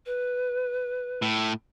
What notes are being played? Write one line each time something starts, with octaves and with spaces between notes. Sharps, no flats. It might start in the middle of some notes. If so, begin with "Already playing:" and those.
B4
A2